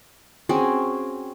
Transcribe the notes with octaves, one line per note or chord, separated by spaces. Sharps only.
C4 C#4 F#4 G#4